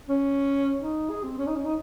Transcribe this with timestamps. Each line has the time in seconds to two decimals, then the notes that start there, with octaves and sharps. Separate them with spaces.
0.09 C#4
0.81 D#4
1.10 G#4
1.23 C4
1.38 C#4
1.47 D#4
1.55 C#4
1.65 D#4